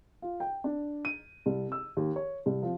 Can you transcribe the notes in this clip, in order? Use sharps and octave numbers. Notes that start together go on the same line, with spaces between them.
F4
G5
D4
D#7
C2
E6
D#2
C#5
C2
F3